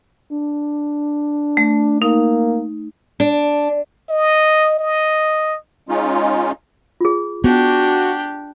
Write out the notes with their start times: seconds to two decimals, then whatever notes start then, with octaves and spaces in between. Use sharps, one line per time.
0.32 D4
1.57 A3
2.02 A#3 D#4
3.20 D4
4.10 D#5
4.79 D#5
5.89 G#3 C#4 D#4 F4
7.01 F4 G#4
7.44 B3 D4 F#4 G4